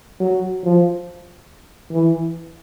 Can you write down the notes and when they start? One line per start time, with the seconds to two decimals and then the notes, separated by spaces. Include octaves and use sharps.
0.20 F#3
0.64 F3
1.92 E3